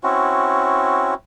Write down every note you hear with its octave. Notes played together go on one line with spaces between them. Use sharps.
C4 C#4 E4 F#4